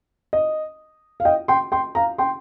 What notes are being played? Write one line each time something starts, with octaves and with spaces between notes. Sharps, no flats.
D#5
F5
D#5 G5
G5 C6
G5 C6
F5 A#5
G5 C6